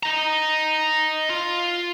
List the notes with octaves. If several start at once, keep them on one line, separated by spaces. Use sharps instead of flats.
D#5 A#5
F4